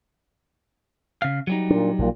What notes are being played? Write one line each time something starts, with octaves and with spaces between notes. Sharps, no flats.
C#3 F5
F#3 G3 D#4
A#2 D4
A#1 A#2